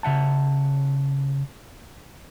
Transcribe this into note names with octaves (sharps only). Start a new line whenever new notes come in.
C#3 E5 F#5 A5